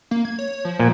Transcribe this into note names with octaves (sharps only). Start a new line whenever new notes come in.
A#3
G#6
C#5
F3
A#2